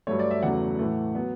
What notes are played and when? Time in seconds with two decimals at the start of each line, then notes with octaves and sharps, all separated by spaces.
0.07 G2 F#3 A3 C#5
0.19 D5
0.31 E5
0.42 E2 C#3 F#3 A3 F#5
0.79 A2 E3 A3
1.15 F#3 B3